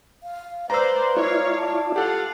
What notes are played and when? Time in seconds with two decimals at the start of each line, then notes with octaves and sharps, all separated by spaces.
0.23 F5
0.70 B4 C5 D5 F5 A#5 E6
1.17 E4 F4 C#5 D5 F5
1.57 A5
1.96 F4 G4 A4 F5 F#5